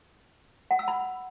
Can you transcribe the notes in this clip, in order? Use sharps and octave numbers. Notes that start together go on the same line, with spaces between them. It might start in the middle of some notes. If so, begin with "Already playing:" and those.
F#5
E6
B5